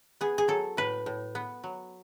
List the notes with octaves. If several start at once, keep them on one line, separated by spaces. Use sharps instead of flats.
B3 G#4
G#4
F#3 A4
A2 B4
A2
B3
F#3